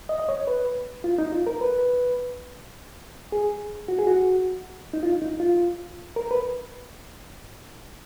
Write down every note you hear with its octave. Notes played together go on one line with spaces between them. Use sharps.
D#5
D#5
C#5
B4
F4
D#4
F4
A#4
B4
G#4
F#4
G#4
F#4
D#4
F4
D#4
F4
A#4
B4